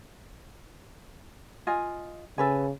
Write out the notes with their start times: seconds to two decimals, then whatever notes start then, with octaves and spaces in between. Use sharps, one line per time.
1.67 F4 D#5 G#5
2.38 C#3 A4 B4 G#5